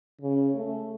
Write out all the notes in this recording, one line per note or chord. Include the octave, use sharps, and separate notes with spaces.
C#3
A3